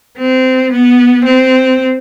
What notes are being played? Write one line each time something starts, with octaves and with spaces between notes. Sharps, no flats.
C4
B3
C4